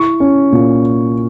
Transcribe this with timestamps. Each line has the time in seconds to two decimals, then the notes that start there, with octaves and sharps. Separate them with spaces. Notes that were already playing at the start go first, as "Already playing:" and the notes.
Already playing: E4 C#6
0.20 C#4
0.52 A#2